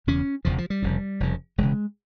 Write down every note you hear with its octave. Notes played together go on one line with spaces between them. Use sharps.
E1 E2 C#3 C#4
E1 E2 C#3 F3
F3
G3
F1 F2 C#3
F1 F2 C#3
E1 E2 C#3 G#3